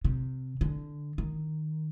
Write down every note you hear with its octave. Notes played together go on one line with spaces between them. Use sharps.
C3
D3
D#3